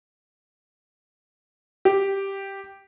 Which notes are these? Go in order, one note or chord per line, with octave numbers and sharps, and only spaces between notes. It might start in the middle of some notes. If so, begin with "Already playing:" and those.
G4